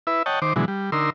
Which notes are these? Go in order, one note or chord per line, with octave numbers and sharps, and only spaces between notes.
E4 B4 E5
C#5 D#5 F#5 G5 A5
D#3 C5 D6
B2 D3 E3 F#3 G#3
G3
D3 D#4 A#4 C6 E6